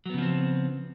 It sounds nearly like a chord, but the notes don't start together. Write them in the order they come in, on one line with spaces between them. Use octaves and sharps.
F#3 B3 C#3 F3 C4